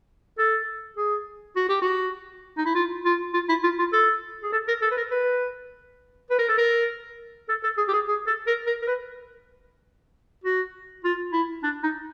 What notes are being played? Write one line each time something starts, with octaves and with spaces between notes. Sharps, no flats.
A4
G#4
F#4
G4
F#4
D#4
E4
F4
F4
F4
E4
F4
F4
A4
G#4
A4
A#4
A4
B4
A#4
B4
B4
A#4
A4
A#4
A4
A4
G#4
G4
G#4
G#4
A4
A#4
A#4
A#4
B4
F#4
F4
E4
D4
D#4